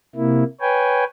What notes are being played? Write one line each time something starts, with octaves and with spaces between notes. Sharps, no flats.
C3 A#3 E4
B4 C#5 G5 G#5